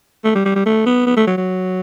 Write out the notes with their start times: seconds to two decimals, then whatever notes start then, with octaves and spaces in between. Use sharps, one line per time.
0.24 A3
0.35 G3
0.45 G3
0.55 G3
0.66 A3
0.86 B3
1.06 B3
1.16 A3
1.27 F#3
1.37 F#3